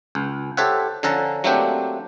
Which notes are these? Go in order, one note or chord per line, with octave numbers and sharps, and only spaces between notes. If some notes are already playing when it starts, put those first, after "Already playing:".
C#2
G4 A4 C5 C#5 E5 F#5
D3 F3 C#4 A4 F#5 A#5
F#3 A3 A#3 C4 D4 G4